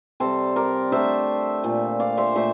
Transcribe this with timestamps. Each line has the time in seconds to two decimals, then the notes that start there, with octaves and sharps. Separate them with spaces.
0.20 C3 G3 A4 C5
0.56 A#4 D5
0.91 D3 A3 C5 E5
1.63 A#2 A3
2.00 D5 F5
2.17 C5 E5
2.35 A#2 A3 C5 E5